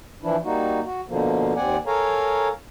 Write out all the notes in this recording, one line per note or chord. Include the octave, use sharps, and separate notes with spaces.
E3 F3 D4 E4
G3 A#3 D#4 F#4
F#4
B2 D3 F3 A#3
D#2 C4 D5 F#5 G#5
A4 A#4 C#5 F5 G#5 A#5